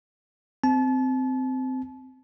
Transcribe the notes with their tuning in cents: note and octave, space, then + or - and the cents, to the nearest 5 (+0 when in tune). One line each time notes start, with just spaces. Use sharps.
C4 -15 A5 -35